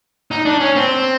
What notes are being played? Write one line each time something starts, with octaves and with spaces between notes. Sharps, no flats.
D#4
D4
C#4
C4